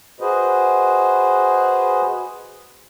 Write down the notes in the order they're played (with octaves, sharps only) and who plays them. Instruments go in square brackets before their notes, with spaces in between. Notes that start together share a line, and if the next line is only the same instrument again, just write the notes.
[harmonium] F#4 G#4 B4 C5 D#5